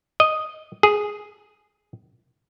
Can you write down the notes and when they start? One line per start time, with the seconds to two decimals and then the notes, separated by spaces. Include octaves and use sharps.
0.20 D#5
0.83 G#4